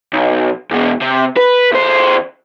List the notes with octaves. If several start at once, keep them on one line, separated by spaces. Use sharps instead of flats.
B1
E2 B2
C3
B4
E2 C5